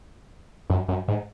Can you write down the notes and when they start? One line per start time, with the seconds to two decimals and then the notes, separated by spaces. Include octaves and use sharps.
0.70 F#2
0.88 F#2
1.08 G#2